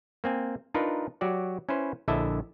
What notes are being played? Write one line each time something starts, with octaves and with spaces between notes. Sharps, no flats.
A#3 C4 G#5
D4 D#4 F4 A#4 B4
F#3 F#4 G4 D5
C#4 E4 B4 C5
A#1 D3 E4 D#5 E5 A5